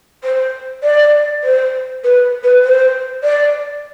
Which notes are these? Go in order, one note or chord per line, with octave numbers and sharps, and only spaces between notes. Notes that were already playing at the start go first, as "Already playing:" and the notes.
C5
D5
C5
B4
B4
C5
D5